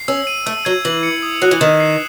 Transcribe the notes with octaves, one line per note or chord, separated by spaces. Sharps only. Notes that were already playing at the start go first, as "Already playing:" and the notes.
Already playing: C7
C#4 E6
D#7
A3 E6
F#3 G#6
E3 F#7
C#7
D#6
F#3 F#6
E3
D#3 E7
C7